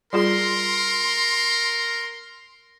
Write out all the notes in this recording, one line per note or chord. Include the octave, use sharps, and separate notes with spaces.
G3 F4 G#4 A#4 C6